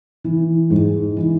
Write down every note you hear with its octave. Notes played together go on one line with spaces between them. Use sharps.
E3
G#2
E3